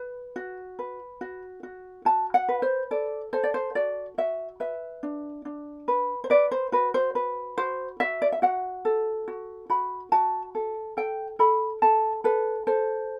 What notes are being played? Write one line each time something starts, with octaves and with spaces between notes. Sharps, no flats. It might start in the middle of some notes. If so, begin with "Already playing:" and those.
Already playing: B4
F#4
B4
F#4
F#4
F#4 A5
F#5
B4
C5
A4 D5
A4 C5
D5
C5
F#4 D5
F#4 E5
B4 E5
D4
D4
B4
C5
B4 D5
C5
F#4 B4
C5
B4
F#4 C5
F#4 E5
D5
E5
F#4 F#5
A4
F#4
F#4 B5
F#4 A5
A4
A4 G5
A4 B5
A4 A5
A4 B4
A4 C5